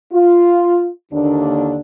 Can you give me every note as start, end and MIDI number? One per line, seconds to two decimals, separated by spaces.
0.12 0.90 65
1.12 1.80 39
1.12 1.80 50
1.12 1.80 58
1.12 1.80 62